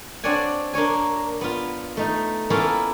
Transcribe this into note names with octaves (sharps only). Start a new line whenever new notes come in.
C4 D4 C#5 D5 F#5 G#5
A#3 D4 C#5 G#5
B3 F4
A3 D#4
A#3 B3 C#4 E4 F4 A4